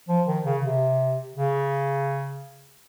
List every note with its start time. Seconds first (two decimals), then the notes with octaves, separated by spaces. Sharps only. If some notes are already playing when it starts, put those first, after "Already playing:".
0.09 F3
0.27 D#3
0.45 C#3
0.63 C3
1.36 C#3